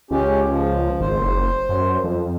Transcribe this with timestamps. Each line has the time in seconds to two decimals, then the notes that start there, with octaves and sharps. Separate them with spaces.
0.11 C#2 C#4 G4
0.49 F3
1.00 G#1 C5
1.18 F#1
1.69 F#2
2.04 F2